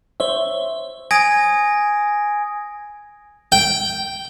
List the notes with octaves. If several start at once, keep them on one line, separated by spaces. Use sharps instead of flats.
C5 C#5 E5
G#5 D#6 G#6 A#6 D7
G5